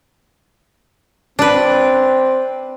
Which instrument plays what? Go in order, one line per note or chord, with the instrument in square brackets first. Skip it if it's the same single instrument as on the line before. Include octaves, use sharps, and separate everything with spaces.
[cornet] C4 [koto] D4 B4